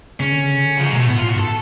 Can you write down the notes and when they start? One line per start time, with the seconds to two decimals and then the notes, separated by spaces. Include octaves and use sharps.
0.20 C#3 C#4
0.32 D3
0.44 C#3
0.65 D3
0.78 C#3 F3
0.86 F#3
0.92 B2 G#3
1.00 A3
1.07 A2 B3
1.18 A2 F4
1.29 F#4
1.36 G#2
1.39 A4